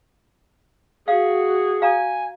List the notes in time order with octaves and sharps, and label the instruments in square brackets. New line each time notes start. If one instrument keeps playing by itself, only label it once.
[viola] F#4 [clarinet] G#4 [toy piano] F5
[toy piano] F5 A#5 [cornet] G#5